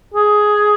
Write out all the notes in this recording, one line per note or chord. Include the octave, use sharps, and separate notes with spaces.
G#4